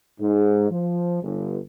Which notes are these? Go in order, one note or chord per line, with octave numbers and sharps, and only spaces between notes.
G#2
F3
G1